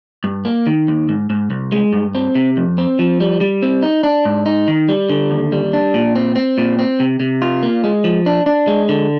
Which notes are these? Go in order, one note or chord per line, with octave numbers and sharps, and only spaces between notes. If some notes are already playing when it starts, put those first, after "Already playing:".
G2
A#3
D#3
D#2
G#2
G#2
C2
G#3
G2
C4
C3
F2
C4
F3
G3
G3
C4
D#4
D4
G#2
D#4
D#3
G3
D3
D#2
G3
D4
A#2
C4
C4
A#2
C4
C3
C3
F4
A#3
G#3
F3
D4
D4
G#3
D3